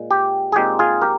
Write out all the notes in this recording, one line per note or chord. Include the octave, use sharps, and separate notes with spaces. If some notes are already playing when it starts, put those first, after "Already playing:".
Already playing: A#2 G#3
G4
G#4
A#2 G#3 C4 D#4 G4
F4 G#4
G4 A#4